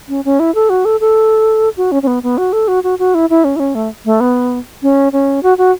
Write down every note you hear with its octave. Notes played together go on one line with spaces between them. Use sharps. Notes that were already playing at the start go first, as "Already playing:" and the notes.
C#4
C#4
E4
A4
F#4
A4
A4
F#4
C#4
C#4
B3
B3
F#4
A4
F#4
F#4
F#4
E4
E4
C#4
E4
C#4
A3
A3
B3
C#4
C#4
F#4
F#4